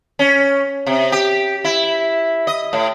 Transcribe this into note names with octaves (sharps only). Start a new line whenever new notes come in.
C#4
C3
G4
E4
D#5
A2